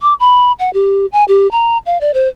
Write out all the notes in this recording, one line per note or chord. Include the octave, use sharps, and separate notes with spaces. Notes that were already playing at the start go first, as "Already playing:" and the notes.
D6
B5
F#5
G4
G#5
G4
A#5
F5
D5
C5